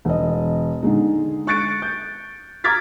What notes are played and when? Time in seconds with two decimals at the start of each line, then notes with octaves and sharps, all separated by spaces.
0.05 E1 D#5
0.82 D3 D#3 G#3 D#4
1.47 C#6 F#6 A6 C#7 D7
1.82 G6
2.64 A#5 D6 F6 G#6 A6 B6